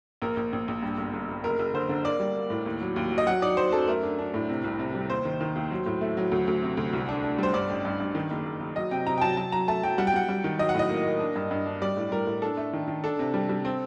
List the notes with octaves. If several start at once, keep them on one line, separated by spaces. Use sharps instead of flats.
A#1 A#4
A#1
A#1
A#1
G2
G1
G1
G1
F#1 A#4
F#1
D3 C5
D3
A#3 D5
G3
A#3
A2
D#2
F#3
D#2
F#3
D#5
F#3 F#5
D#4 D5
F#3 C5
F#2 A4
A3 A#4
D4
D4
A2
C3
C2
C3
G3
D#2 C5
D#3
D#3
D#2
F#3
A2
A3
F#3
D2
D2
C3
D2
C2
D4
D4
G3 C5
G2 D5
A1
G2
G2
D#3
F#1
F#1
F#1
F#3 D#5
C3 G5
C3 A#5
G5
F#3 A5
F#3 A5
F#3 A#5
A3 A5
F#3 G5
G3 F#5
G5
G3 F#5
G3
D#3
F#3 D#5
F#5
A2 D#5
A#3
A#3
D4
G2
G2
D4
G3 D5
A2
G3 A#4
A2
D4 A4
A3
D#3
D#3
D4 A4
C3
G3
G3
C4